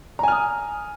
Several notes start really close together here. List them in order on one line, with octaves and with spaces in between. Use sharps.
A#5 G#5 F6 D#6